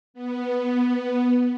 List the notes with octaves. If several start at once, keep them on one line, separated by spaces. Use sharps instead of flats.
B3